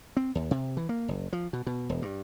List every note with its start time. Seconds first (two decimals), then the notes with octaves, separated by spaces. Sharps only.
0.17 C4
0.35 D#2
0.51 C3
0.77 E3
0.89 A#3
1.08 F#1
1.33 F3
1.53 B2
1.67 B2
1.89 E1
2.02 G2